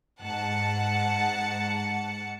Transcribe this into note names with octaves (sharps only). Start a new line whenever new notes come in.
G#2 F#5 A5 C#7